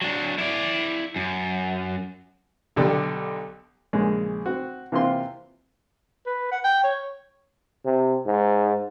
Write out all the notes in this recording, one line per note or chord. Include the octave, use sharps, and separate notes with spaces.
F#3 D4
E4 D5
F#2
B1 D3 G4 D5
A#1 C#3 G#3
C4 F#4
C3 E3 A#3 C4 F4 C6
B4
F#5
G5
C#5
C3
G#2